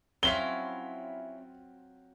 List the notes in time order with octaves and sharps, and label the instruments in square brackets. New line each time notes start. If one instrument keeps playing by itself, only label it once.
[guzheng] F#3 C4 F4 [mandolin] C#4 E4 F5 [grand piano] G7